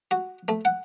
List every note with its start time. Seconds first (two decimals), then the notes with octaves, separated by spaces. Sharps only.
0.11 F#4
0.48 A3
0.65 F#5